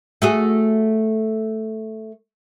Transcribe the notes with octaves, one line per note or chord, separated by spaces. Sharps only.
A3 F#4 G#4